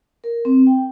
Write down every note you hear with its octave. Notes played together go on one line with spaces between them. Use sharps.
A#4
C4
G5